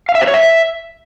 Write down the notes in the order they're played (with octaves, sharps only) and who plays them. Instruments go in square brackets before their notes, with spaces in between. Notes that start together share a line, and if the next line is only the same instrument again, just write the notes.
[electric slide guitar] F5
E5
C5
C#5
E5